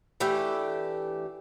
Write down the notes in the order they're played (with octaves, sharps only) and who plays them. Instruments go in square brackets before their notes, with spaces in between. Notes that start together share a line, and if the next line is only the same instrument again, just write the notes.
[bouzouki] E3 A3 D4 G4